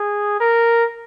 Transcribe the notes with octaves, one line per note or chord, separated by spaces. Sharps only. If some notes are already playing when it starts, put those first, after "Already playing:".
Already playing: G#4
A#4